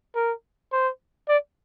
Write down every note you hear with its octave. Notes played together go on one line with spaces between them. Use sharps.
A#4
C5
D5